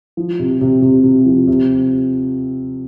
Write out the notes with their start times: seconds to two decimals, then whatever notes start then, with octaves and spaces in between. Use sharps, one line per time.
0.17 F3
0.40 C3
0.61 C3
0.82 C3
1.04 C3
1.26 F3
1.48 C3